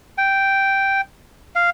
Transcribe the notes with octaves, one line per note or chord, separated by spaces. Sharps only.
G5
F5